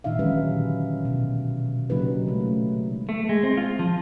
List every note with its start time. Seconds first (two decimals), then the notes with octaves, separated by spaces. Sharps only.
0.04 A#2 D#3 D#4 E5 F5
0.19 E3 F#3 G#3 C#4 G4 B4
0.48 D3
1.05 B2
1.90 C#3 F#3 A#3 D#4 G4 B4
2.27 G#3 A3
3.09 A3
3.29 G#3
3.43 C4
3.57 F4
3.79 F3